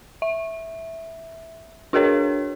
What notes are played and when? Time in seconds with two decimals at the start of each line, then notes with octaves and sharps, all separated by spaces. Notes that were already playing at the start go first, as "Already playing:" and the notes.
0.22 E5
1.93 D4 F#4 G#4 A#4 C#5